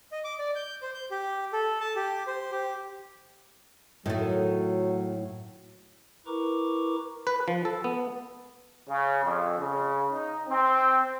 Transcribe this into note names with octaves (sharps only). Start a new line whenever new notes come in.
D#5
D6
D5
G6
C5
G6
G4
A4
A5
G4
C5
G4
A2 D#3 F#3 A3
E4 A#4 B4 A#5 C#6 D6
B4
F3
A4
B3
C#3
F2
C#3
D#4
C4